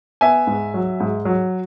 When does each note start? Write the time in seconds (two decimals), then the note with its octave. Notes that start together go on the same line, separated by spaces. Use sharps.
0.21 B3 E5 G#5
0.47 G#2
0.74 F#3
1.00 G#2
1.25 F#3